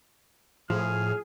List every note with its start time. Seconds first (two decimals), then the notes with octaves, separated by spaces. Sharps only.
0.70 A2 F3 G#4 F6